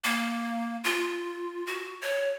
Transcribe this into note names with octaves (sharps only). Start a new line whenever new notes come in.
A#3
F4
F#4
C#5